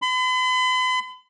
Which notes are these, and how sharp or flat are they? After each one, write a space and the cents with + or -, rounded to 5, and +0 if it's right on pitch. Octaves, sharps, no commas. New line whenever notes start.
B5 +45